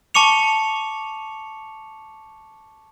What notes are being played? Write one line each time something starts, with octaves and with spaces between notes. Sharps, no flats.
A5 C#6 D6 C#7 F7